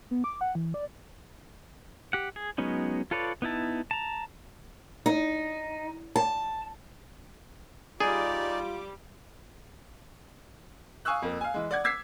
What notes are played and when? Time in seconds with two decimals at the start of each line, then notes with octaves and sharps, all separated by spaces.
0.11 B3
0.24 D6
0.41 F#5
0.55 E3
0.74 D5
2.13 G4 F#5
2.36 G#4
2.58 F#3 G#3 B3 C#4 D#4
3.11 F4 A4 B4 C#5 D5
3.42 B3 D#4 E4 A5
3.91 A5 A#5
5.06 D#4
6.16 A5
8.00 G3 D#4 F4 G#4 D5 D6
11.05 F5 G#5 C#6 D#6 E6 F#6
11.22 F2 A#3
11.41 F5 G#5
11.54 E3 G#3
11.71 D5 F#5 G#6
11.84 D6 E6 G#6 B6 C7